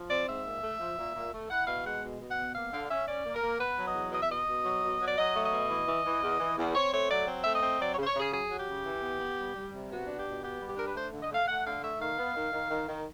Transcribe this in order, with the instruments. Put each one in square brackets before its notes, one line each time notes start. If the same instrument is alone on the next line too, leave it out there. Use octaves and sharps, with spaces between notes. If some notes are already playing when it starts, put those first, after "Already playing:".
Already playing: [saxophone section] F3
C4 D5
G#2 E5
A#2
A3
F3
A#2
A#2
A3
E4 F#5
B2 F5
G#3 F#5
B2
B2
F#5
B3
A#3 F5
D3 F5
C#4 E5
C#4 D5
A#3
A#4
A#3
B3 B4
F#3
D#5
E2
B2 D#5
E5
B2 D#5
B2
F#3
B2
F#3
D5
F#3 D#5
A3
D#5
B2
E3
E3
E3
E2
E3
E2
C4 C#5
A3 C#5
F#3 D5
C4
A3 E5
D#5
C4
F#3 D5
C#5
C#3 C5
C#5
C#3 G#4
F#3 G#4
F#3
G4
C#3
E3
B3
B3
G3
G3
C3
B3 F#4
D4
G4
B2
B3 G4
G3
G4
D4 A#4
B4
A3 C5
D3
D#5
A3
F5
A3 F#5
D3 F5
A3 E5
D#3 F5
B3
D#3
D#3
D#3
D#3